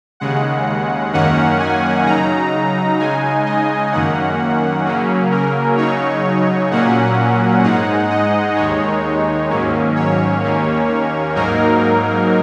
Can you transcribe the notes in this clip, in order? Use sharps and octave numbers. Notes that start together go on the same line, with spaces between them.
D#2 C#3 G#3 F#5
F#2 D#3 A#3 C#4 F#5
G#5
C#3 F#3 D#4 A#5
C#3 G#3 D#4 G#5
D#5
F#2 D#3 A#3 C#4 F#5
C#3 F#3 A#3 C#4
A#4
C#3 F#3 D#4 C#5
A#2 F#3 A#3 C#4 F#5
G#2 G#3 D#4 F#5
D#5
D#2 D#3 G#3 D#4 C#5
G#2 D#3 F#3 A#3 C#4
C#5
D#2 D#3 A#3 C#4
G#2 F#3 A#3 D#4 A#4